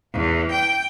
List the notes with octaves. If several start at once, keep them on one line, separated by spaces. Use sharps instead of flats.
E2
G5